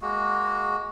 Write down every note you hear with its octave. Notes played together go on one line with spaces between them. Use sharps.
G#3 A#3 F#4